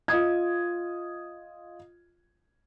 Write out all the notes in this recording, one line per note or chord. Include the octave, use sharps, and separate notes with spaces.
F4 D#5 D#6 G#6